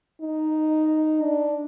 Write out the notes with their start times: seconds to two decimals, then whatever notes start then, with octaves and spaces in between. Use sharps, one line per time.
0.21 D#4
1.23 D4